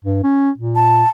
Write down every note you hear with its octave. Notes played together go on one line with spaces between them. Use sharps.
G2
C#4
A#2
A5